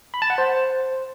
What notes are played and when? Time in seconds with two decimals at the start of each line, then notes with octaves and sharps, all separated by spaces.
0.14 B5
0.22 A5
0.30 F#5
0.38 C5